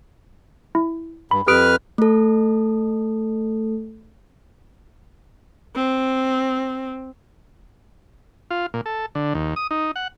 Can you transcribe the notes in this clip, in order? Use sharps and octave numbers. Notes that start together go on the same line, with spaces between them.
E4
G2 B5
F2 G4 B4 D#6 F6 D7
A3 A4
C4
F4
A#2
A4
D3
D#2
D#6
D#4
F#5